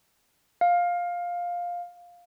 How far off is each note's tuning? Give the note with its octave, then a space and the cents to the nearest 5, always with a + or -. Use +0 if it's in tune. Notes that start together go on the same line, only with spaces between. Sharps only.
F5 +10